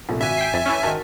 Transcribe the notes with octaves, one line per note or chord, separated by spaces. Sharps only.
A#1 C3 A3
G#1 F#4 E5 G#5
G5 B6 C7
F2 A6 B6
E3 A3 C#4
G#2 D#3 F#4 A#4 A5